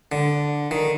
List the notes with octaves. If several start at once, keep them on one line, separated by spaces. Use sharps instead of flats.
D3
D#3